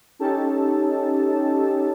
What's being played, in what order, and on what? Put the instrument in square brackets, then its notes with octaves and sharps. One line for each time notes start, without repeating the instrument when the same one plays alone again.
[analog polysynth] C#4 D#4 G4 A4 A5